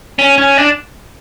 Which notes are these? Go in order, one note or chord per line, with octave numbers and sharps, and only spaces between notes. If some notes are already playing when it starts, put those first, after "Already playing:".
C#4
C#4
D4